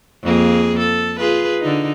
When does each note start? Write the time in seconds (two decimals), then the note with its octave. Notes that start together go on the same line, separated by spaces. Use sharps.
0.24 F2 A#3 G#4
0.79 A4
1.19 F4 G#4 B4
1.62 D3 D#4